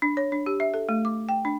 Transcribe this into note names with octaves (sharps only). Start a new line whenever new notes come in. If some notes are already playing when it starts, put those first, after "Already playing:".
D4
C#5
D4
G4
E5
A4
A3
D6
G5
D4